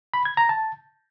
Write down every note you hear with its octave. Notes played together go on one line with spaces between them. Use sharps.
B5
G#6
A#5
A5